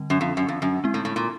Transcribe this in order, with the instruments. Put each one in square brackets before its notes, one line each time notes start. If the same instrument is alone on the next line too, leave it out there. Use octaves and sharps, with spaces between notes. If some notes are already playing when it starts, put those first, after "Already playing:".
Already playing: [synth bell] D3 G3 C4
[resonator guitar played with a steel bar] F#2
F2
F#2
F2
F#2
[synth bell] G#3 C4 E4
[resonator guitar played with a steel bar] A2
A2
A#2